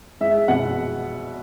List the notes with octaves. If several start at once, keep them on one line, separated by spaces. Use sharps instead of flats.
G#3 E5
B2 F#5